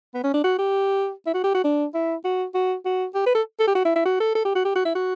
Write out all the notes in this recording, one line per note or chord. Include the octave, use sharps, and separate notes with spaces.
B3
C#4
D4
F#4
G4
E4
F#4
G4
F#4
D4
E4
F#4
F#4
F#4
G4
B4
A4
A4
G4
F#4
E4
E4
F#4
A4
A4
G4
F#4
G4
F#4
E4
F#4